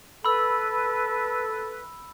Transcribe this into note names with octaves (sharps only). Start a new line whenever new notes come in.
A4 B4 B5 E6